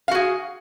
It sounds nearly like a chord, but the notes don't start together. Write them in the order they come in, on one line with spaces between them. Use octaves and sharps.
F5 F#4 G#4